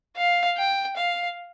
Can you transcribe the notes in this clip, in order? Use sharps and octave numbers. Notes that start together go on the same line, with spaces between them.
F5
G5
F5